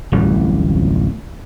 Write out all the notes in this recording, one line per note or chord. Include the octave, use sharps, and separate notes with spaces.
D1 A1 F2 G3